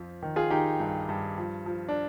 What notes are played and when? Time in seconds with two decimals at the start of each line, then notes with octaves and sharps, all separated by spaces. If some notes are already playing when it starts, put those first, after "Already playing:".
Already playing: F2 F3
0.23 D#3
0.36 F4 G#4
0.51 D#3 D#4 G4
0.80 G2
1.09 G2
1.38 F3
1.66 F3
1.88 D4